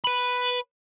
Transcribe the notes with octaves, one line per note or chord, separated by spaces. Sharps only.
B4 B5